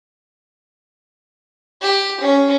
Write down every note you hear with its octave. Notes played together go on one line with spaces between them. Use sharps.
G4
C#4